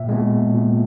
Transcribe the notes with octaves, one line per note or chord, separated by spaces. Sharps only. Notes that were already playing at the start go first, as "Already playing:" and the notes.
Already playing: A#2 E5
G#3 B3
A#2